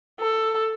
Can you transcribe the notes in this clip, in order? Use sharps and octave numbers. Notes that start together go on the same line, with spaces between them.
A4